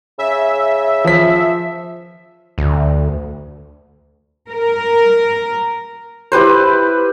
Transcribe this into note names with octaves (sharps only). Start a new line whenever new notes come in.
C#3 E5
F3 B6
D2
A#4
E4 G4 B4 C5